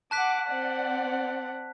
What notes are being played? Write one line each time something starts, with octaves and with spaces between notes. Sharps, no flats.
F#5 A5 D6 F#6 B6
C4 D5 F#5